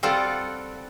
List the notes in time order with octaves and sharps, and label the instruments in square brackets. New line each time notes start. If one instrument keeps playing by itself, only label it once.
[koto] G3 C4 F4 A4 D5 F#5